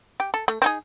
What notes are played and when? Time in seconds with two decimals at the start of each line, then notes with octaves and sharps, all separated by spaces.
0.20 G4
0.34 A4
0.48 A3
0.62 C4 D#4 G#4